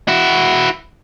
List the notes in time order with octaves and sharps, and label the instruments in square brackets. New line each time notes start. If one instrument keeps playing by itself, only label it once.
[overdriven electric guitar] E4 F#4